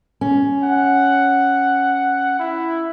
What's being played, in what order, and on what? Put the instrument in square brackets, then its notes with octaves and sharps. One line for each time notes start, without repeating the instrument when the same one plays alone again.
[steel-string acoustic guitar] C#4
[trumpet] F#5
E4